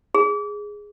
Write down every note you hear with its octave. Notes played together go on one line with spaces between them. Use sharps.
G#4